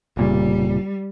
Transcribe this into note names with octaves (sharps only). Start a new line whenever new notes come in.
F1 A#2 C#3 G3